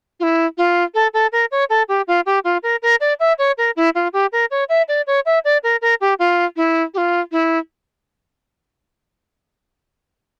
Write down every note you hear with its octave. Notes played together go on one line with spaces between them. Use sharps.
F4
E4
F4
A4
A4
A#4
C#5
A4
G4
F4
G4
F4
A#4
A#4
D5
E5
C#5
A#4
E4
F4
G4
A#4
C#5
E5
D5
C#5
E5
D5
A#4
A#4
G4
F4
E4
G4
F4
E4